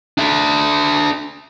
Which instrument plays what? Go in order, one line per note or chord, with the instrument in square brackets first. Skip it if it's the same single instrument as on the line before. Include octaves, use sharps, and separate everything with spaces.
[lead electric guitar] D4 E5